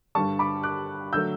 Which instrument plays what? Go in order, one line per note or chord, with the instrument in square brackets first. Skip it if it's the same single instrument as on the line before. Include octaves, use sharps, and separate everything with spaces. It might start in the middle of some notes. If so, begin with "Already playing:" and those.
[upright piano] G2 D3 G3 A5 C#6
B5 D6
D6 F#6
D3 F#3 A3 E6 G6